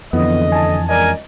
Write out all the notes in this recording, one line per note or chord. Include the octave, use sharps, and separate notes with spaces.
F#1 F2 D3 E3 B3 D#5
G#5 A5
C#2 A#4 D5 D#5 G#5